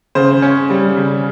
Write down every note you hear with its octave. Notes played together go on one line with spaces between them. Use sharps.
C#3 C5
C#4
G3
C#3